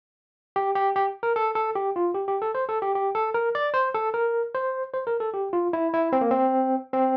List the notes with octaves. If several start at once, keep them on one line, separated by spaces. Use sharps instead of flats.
G4
G4
G4
A#4
A4
A4
G4
F4
G4
G4
A4
C5
A4
G4
G4
A4
A#4
D5
C5
A4
A#4
C5
C5
A#4
A4
G4
F4
E4
E4
C4
A#3
C4
C4